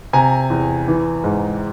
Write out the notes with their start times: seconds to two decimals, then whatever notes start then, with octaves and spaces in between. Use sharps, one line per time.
0.13 C3 G#5 A#5
0.50 E2
0.88 E3
1.24 G#2